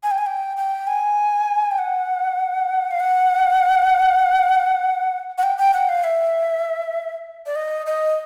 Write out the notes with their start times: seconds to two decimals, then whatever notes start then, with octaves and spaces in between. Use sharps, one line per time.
0.03 G#5
0.11 G5
0.18 G#5
0.26 G5
0.57 G5
0.87 G#5
1.72 G5
1.78 F#5
2.91 F5
3.00 F#5
5.38 F#5
5.43 G5
5.58 G5
5.74 F#5
5.89 F5
6.04 E5
7.46 D5
7.56 D#5
7.86 D#5